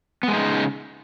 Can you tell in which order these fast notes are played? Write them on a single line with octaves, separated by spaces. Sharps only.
B3 G#3 D#4 C#3